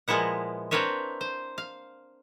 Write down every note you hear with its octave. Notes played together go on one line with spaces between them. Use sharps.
A#2 F3 G#3 B3 E4 F#5
C4 D4 A#4 B4 C#5 E5
C5
F5